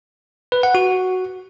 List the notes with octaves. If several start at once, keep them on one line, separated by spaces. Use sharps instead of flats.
B4
F#5
F#4